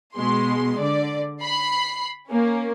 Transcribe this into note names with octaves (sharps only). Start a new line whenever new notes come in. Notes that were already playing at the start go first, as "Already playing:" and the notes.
B2 G#3 C6
D3 D5
B5 C7
A#3 C#4